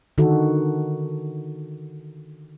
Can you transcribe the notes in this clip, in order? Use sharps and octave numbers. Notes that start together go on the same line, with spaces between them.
D3 D#3 D#4 F#4 A4